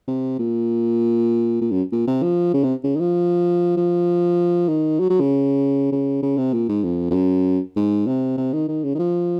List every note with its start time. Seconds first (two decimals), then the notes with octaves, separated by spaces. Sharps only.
0.08 C3
0.39 A#2
1.61 A#2
1.72 F#2
1.92 A#2
2.08 C3
2.23 F3
2.54 C#3
2.64 C3
2.84 C#3
2.96 D#3
3.00 F3
3.77 F3
4.68 D#3
5.00 F#3
5.10 F#3
5.20 C#3
5.92 C#3
6.23 C#3
6.38 C3
6.54 A#2
6.69 G#2
6.84 F2
7.11 F2
7.14 F#2
7.76 G#2
8.07 C3
8.38 C3
8.53 D#3
8.68 D#3
8.84 C#3
8.95 D#3
8.99 F3